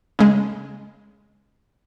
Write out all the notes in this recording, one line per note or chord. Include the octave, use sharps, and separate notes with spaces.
C#3 G#3